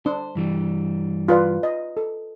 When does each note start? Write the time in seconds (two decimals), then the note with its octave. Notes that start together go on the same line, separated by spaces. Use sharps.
0.06 D4 C5
0.35 G2 E3 G3
1.28 F4 B4 D5
1.63 D#5
1.97 A4